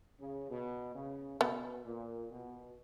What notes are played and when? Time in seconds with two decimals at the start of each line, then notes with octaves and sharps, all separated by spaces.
0.20 C#3
0.51 B2
0.95 C#3
1.40 B2 B3
1.86 A#2
2.32 B2